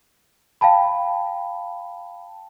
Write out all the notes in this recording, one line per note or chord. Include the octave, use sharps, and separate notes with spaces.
F5 G5 A5 B5